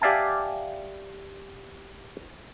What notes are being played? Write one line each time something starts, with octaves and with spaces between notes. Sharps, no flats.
G4 D5 E5 F5 G#5 A5